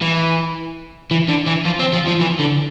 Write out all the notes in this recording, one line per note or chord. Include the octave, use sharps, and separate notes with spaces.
E3
E3
D3
E3
F3
C4
F3
F3
E3
D3